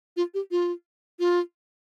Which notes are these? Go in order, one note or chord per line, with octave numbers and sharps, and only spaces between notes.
F4
G4
F4
F4